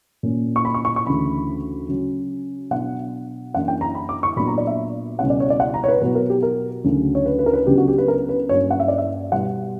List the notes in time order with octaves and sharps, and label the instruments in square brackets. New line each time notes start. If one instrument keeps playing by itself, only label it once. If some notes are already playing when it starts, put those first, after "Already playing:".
[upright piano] A#2 A#3 C#4
C#6
B5
C#6
C#6
C#6
D2 C#3 E3 B5
C#3 F#3 C#4
B2 F#3 B3 D4 F#5
F#2 E3 A#3 D4 F#5
G5
A#5
B5
D6
C#6
A#2 F#3 B3 D4 B5
A#5
D5
E5
C#2 B2 G3 C#4 F#5
D5
C#5
D5
F#5
A#5
C#5
B4
B2 F#3 B3 B4
A#4
G4
A#4
D2 C#3 F#3
C#5
B4
B4
A#4
B4
C#2 C#3 F#3 B3 D4 G4
F#4
G4
B4
A#4
B4
G2 F#3 A#3 C#4 C#5
F#5
E5
D5
E5
B2 G3 B3 F#5